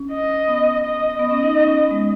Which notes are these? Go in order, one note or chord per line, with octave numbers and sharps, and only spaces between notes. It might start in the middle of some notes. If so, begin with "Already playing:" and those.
Already playing: C#4
D#5
B3
D#5
B3 D#5
C#4
D#4
D#4
C#4
B3
G#3